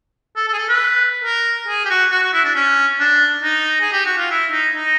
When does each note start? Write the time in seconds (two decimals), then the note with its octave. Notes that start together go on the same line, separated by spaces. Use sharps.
0.37 A4
0.48 A4
0.53 G#4
0.58 A4
0.69 B4
1.24 A#4
1.68 G#4
1.85 G4
1.90 F#4
2.12 F#4
2.23 F#4
2.34 E4
2.45 D4
2.55 C#4
2.99 D4
3.43 D#4
3.81 G#4
3.93 G4
4.06 F#4
4.18 F4
4.31 E4
4.52 D#4
4.75 D#4